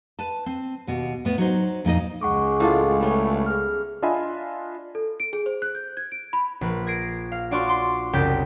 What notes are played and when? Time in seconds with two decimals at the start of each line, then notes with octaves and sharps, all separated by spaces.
0.19 B4 A5
0.46 C4
0.87 D#2 B2
1.25 A2 B3
1.38 F#3 D#4 C5
1.85 F2 A#2 D#4 D#5
2.21 C#2 G#3 F#5 C#6 D6
2.60 A2 D4 F4
3.00 G3 A3 B3 C#4
3.46 G#4 F6
4.02 D4 F4 D#5 E5 G#5 B5
4.95 A4
5.20 D7
5.33 G#4
5.46 C5
5.62 F#6
5.75 G6
5.97 G#6
6.12 D7
6.33 B5
6.61 A#1 B4
6.87 G#6 A#6 C7 D7
7.32 F5
7.51 D4 F#4 D5 F5 C6 C#6
7.67 C6 D6
8.13 F#1 C2 G4 G6 B6